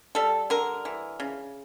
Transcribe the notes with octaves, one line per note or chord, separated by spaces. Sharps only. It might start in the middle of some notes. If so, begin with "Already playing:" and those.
G3 A4
D3 A#4
E3
C#3